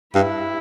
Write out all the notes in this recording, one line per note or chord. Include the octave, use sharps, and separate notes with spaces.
G2 E4